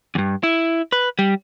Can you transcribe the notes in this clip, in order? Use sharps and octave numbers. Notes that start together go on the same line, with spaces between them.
E2 G2
E4
B4
G3